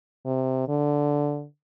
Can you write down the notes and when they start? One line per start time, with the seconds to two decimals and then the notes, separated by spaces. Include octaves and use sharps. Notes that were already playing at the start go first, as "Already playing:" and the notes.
0.26 C3
0.68 D3